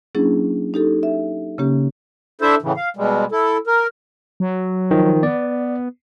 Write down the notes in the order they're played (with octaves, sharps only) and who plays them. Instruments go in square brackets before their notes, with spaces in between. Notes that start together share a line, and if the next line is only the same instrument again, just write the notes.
[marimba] F#3 A#3 C#4 D4 E4 G#4
D#4 G4 A4
E5
C#3 A#3 C#4 G4
[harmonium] D4 E4 A4 C5 E5
A2 C#3 E3
F5
B2 G3 G#3
E4 A4
A#4
[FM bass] F#3
[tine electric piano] D#3 F3
[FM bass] B3 [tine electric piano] D5